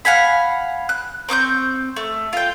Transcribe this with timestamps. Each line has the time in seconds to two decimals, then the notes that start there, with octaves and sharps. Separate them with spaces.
0.05 F5 F#5 G#5 B5
0.89 F#6
1.29 C4 C#6 D6 G6
1.96 A3
2.33 F4 G5